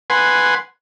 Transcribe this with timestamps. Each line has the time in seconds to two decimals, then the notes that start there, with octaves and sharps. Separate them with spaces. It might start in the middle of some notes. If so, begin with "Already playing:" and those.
0.10 B4 F#5 G#5 C6